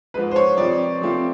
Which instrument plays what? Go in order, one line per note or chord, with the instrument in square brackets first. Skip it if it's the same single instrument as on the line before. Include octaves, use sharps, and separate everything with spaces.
[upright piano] G#2 F3 G#3 [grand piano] B4
[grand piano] C5
C#5
[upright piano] F2 C3 F3 [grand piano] D5
[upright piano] C3 F3 A3 C4 F4